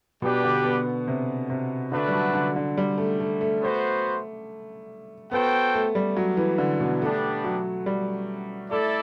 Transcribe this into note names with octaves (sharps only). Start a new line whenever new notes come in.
B2 G3 D4 G4 B4 D5
D3
B3
C3
C3
D3 A3 D4 F#4 B4
G3
F#3
D3
D3
G3
A3
A3
A3
B3 F#4 C5
B3 F#4 A4 C5 G5
A3
G3
F#3
E3
D3
B2
G3 A3 B3 D4 G4
F#3
G3
A3 E4 A4 D5